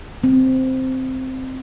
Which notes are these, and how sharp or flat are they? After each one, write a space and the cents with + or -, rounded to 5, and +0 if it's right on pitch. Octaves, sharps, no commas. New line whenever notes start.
C4 -5